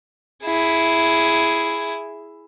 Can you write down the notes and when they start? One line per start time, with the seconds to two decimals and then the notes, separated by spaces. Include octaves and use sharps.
0.44 E4 G#4